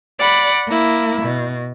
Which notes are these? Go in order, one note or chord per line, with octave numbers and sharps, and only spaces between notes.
D5 F#5 B5
A#3 E4
B2